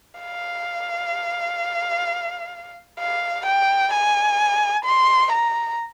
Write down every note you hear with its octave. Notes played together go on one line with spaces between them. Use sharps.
F5
F5
G5
G#5
C6
A#5